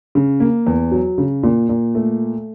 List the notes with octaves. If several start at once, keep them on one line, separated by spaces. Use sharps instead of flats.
C#3
A#3
E2
F#3
C#3
A#2
A#2
A3